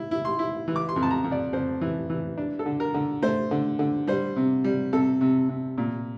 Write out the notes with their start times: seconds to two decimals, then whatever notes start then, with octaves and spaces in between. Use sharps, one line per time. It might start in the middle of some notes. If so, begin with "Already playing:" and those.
Already playing: E4
0.11 E4
0.25 C6
0.39 E4
0.68 E3
0.76 D6
0.89 C6
0.96 F2
1.03 A5
1.10 A#5
1.24 F2
1.32 D5
1.53 F2 C5
1.81 E3
2.10 E3
2.37 D4
2.59 A4
2.66 D3
2.80 A#4
2.94 D3
3.22 A3 C5
3.51 D3
3.79 D3
4.07 G3 C5
4.36 C3
4.64 G3
4.93 C3 A4
5.21 C3
5.49 C3
5.78 A#2